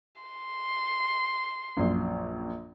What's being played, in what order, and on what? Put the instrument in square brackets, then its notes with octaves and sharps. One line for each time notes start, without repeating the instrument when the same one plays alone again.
[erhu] C6
[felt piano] A#1 F#2